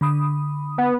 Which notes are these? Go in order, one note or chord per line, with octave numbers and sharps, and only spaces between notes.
D3 B5 D#6
B3